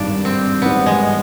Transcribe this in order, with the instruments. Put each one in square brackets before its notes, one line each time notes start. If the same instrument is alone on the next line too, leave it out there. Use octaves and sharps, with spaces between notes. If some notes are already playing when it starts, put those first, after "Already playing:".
Already playing: [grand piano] G#1 G2 D#3 G3 [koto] D4
[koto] C4
[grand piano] G#1 G2 D#3 G3 [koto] B3
[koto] G#3